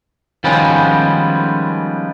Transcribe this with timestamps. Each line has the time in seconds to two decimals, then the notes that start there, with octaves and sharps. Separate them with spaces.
0.44 D#3 F3 G3 G#3 B3 C#4